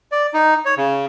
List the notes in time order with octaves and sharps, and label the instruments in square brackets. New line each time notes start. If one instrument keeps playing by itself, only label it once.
[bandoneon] D5
D#4
C#5
C#3